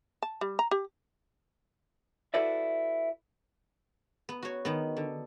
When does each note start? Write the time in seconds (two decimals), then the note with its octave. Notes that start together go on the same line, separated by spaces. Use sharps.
0.22 A5
0.41 G3
0.59 A#5
0.71 G4
2.34 E4 F#4 A4 B4 D5 E5
4.29 B3
4.43 F#4 C#5
4.65 D#3 B3
4.97 D3